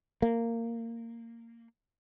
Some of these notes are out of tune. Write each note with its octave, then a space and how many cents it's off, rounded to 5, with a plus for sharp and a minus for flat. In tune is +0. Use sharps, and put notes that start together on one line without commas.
A#3 -15